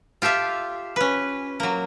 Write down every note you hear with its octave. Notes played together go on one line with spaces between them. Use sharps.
F4 G4 A4 E5 F5
C#4 B4
F#3 A#3